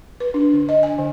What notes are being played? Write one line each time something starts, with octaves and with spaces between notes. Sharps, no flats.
B4
D4
D3
D#5
G#5
D3